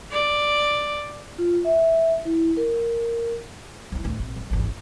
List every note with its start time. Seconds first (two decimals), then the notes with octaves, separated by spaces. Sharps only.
0.11 D5
1.38 F4
1.65 E5
2.25 E4
2.57 A#4
3.92 F3 E4
4.04 A1 D2
4.19 A#1 C3
4.36 F#2
4.50 G#1 E2
4.65 F4